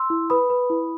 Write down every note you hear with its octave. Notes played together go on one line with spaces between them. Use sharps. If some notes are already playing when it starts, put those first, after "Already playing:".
Already playing: C6 E6
E4
B4 B5 D#6
B4
E4